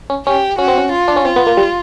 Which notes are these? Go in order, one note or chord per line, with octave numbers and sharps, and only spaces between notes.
C#4
C#4 G4
C#4 F#4
C4
C#4
F4
D4
C#4
C4 F4
B3
A#3
G3